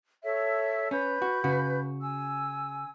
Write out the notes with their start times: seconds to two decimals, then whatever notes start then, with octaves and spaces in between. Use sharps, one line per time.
0.24 A4 C#5 E5
0.91 C#4 B4 B5 G6
1.22 F#4
1.44 C#3 F#4
2.02 G#5 E6